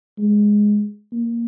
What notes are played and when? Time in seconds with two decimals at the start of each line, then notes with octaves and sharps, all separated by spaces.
0.19 G#3
1.12 A#3